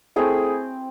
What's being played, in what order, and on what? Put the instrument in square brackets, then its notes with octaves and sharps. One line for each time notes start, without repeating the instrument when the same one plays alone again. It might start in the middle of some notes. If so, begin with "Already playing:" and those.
[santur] A3 C4 E4 G#4